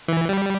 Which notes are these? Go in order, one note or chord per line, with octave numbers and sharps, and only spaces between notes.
E3
G3